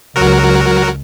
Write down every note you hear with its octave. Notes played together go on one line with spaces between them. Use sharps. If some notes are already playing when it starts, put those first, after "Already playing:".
C#2 F#3 F#4 A#4